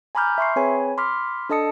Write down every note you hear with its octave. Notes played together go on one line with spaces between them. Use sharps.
G#5 A#5 B5 D6 F6 G6
E5 C6 C#6 C7
C4 G#4 B4 C#5 G#5 B5
B5 C6 D6 F6 B6
D4 A4 D#5 A5 D#6 C#7